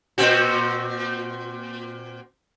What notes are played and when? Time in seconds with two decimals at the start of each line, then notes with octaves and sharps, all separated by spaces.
0.18 A#2 C4 F#4